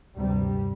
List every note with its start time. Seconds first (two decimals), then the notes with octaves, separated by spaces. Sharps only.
0.16 D2 G2 C3 G3